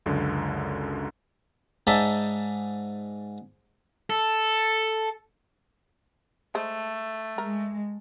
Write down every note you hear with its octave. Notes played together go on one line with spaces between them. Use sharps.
C#2 F#2 D3
G#2 D#4 D5 E5 A5
A4
G#3 A3 C5
G#3 A#4